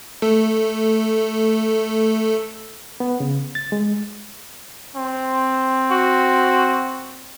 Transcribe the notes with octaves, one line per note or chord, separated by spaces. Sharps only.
A3 A4
B3
C#3
A6
G#3
C4
F#4